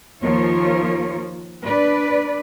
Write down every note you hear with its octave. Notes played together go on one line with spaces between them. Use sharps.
D#2 F3 F4 A#4 C#5
D4 B4 D5